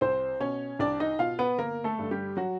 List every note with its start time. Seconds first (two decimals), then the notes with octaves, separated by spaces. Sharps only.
0.01 C2 C4 C5
0.40 B2 C#4 C#5
0.79 C2 D4 D5
1.00 D#4 D#5
1.19 B2 F4 F5
1.39 B3 B4
1.58 G1 A#3 A#4
1.84 A3 A4
1.98 G2 D3
2.11 G3 G4
2.37 F#3 F#4